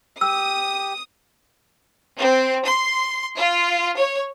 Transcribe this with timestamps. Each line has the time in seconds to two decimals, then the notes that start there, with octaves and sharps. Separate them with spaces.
0.21 G4 D#6 E6
2.18 C4
2.65 C6
3.37 F4
3.97 C#5